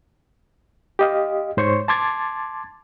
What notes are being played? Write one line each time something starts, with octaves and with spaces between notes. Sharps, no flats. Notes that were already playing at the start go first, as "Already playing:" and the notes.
G4 D#5 F5
G#2 C5 C#5 C#6
A5 C6 D6 G#6 A6